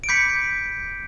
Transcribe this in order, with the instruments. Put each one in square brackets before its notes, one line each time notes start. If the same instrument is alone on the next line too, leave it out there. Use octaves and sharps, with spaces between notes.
[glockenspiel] D7
B5 D6 G6 B6 C#7